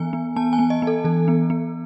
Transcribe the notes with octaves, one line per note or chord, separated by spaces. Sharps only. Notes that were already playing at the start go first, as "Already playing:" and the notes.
Already playing: E3 B3 G#5
B3
B3 A5
G#5
B3
D#5
B3
A4
E3 A4
B3
B3